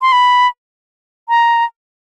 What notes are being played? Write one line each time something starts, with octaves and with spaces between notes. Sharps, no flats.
C6
B5
A#5